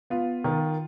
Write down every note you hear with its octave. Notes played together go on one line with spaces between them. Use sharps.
B3 F4
D#3